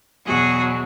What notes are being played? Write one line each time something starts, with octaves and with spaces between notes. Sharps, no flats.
E2 B2 F#3 F#4 G#4